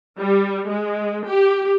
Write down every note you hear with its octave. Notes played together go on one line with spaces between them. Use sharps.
G3
G#3
G4